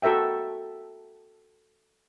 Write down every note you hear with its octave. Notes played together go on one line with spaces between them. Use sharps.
F#4 A4 A#4 E5 G5